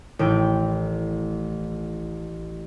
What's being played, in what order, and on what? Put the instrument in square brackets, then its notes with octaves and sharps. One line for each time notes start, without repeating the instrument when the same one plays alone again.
[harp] A1 G5 [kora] A2 D#3